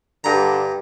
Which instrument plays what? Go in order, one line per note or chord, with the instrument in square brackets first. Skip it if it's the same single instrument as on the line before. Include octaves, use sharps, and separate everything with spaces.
[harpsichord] G2 A#5 [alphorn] D3